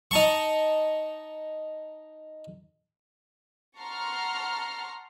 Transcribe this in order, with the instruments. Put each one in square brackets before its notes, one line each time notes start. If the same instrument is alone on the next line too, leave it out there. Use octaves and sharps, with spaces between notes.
[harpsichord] D#4 A5 C#6
[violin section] F#5 A5 A#5 C6 C#6 F6